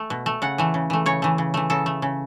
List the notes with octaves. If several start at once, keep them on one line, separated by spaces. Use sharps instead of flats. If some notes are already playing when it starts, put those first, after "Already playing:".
Already playing: A3
B2
A3
C#3 F#5
E3 A3
C#3
E3 A3
C#3 C#5
E3 A3
C#3
E3 A3
C#3 A4
A3
C#3